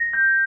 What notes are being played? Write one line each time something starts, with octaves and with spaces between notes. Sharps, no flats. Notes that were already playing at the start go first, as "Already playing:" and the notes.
Already playing: A#6
G6